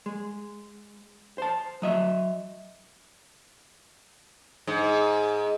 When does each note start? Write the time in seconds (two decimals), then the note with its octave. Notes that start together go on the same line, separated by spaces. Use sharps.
0.06 G#3
1.38 C5 A5
1.82 F#3 D#5 E5
4.67 G#2